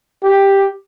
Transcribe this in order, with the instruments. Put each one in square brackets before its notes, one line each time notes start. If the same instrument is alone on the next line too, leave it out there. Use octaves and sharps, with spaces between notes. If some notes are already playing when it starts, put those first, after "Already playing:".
[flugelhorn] G4